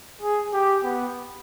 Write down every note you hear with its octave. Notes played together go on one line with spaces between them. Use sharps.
G#4
G4
B3